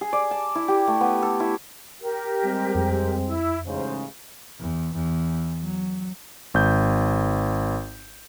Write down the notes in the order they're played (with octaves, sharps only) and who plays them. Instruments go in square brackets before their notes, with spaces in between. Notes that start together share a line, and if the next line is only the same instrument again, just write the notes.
[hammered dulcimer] G#4
D5
A5
E4
G4
A3
B3
A4
E4
[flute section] G4 A#4
[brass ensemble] G3 G#3 C4
[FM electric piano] F2
[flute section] E4
[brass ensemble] A1 G#2 C#3 [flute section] C5
[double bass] E2
E2
F#3
[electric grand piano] G#1 G6